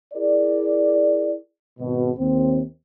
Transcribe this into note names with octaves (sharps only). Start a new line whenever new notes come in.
E4 G#4 A#4 D5
G#1 B2
D#2 C4